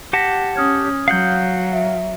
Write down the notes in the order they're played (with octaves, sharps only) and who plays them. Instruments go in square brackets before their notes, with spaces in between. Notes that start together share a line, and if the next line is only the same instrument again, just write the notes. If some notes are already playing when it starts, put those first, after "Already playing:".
[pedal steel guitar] G4 F#5 A5 [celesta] A#6 B6
[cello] C#4 [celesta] D#6 F6 G#6
[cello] F#3 [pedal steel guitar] F5 F#5 G6
[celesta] E5